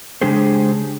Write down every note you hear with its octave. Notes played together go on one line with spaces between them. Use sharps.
C#3 G#3 D4 G4 G#4 C5